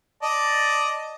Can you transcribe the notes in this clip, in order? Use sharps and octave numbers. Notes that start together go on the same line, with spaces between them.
D5 D#5 A5